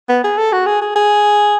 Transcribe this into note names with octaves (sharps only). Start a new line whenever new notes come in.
B3
G#4
A4
F#4
G#4
G#4
G#4